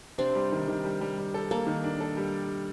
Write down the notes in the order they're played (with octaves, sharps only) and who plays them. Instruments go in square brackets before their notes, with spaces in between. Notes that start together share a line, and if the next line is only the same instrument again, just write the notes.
[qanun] C3 C4 [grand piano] D4
[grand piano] G3
D#3
D#3
G3
G3
G3
A4
[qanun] A#3 [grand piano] A4
[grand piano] D#3
D4
A4
G3